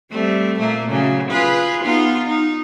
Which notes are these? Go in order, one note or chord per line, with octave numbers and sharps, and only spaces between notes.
G3 A3 C4
A#2 A3 A#3
C#3 F#3
F4 G#4 B4
B3 D#4 F4
D#4